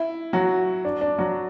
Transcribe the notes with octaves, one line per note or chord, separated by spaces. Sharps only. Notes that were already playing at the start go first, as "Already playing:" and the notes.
Already playing: E4
F#3 F#4
D4
D4
F#3 F#4